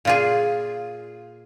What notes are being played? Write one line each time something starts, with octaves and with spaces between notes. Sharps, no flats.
A#2 F4 G#4